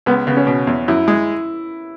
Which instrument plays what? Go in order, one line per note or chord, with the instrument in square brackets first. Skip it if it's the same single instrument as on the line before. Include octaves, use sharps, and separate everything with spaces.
[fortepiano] C#2 [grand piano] B3
[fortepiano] C#3 [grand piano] B3
[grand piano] C#4
[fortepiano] B2
E2
[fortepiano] F#2 [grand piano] E4
[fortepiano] G#3